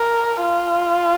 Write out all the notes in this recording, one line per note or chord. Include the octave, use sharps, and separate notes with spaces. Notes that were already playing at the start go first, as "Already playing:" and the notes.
Already playing: A#4
F4